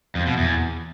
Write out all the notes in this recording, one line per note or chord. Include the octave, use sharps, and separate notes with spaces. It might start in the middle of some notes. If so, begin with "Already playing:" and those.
F2
B2
E2